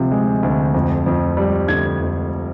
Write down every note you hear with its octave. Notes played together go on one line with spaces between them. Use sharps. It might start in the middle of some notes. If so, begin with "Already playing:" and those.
Already playing: D2 C3 F3
G#3
D2
F2
F2
G3
D3 G#6
F2